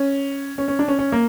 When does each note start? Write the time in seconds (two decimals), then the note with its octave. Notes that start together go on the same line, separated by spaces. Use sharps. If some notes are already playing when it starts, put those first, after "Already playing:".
Already playing: C#4
0.58 C#4
0.68 C#4
0.79 D4
0.88 C#4
0.99 C#4
1.12 A#3